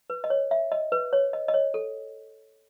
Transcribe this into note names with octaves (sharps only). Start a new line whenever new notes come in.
B4
D#5
C#5
E5
D#5
B4
C#5
D#5
D#5
C#5
A4